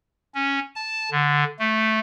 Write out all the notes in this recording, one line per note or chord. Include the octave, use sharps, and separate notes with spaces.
C#4
A5
D3
A3